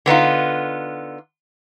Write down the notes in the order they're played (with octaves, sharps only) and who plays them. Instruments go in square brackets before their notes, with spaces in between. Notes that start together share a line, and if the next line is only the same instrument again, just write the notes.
[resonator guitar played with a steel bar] D3 B3 D#4 F4